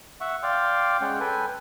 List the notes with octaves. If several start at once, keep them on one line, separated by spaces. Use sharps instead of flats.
E5 F#5 C#6
D5 F5 G5 C6 D6
G#3 C#4 F#5 G5
A4 B4 G5 G#5